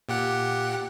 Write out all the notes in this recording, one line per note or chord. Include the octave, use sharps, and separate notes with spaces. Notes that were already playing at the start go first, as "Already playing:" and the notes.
A#2 G4 F#5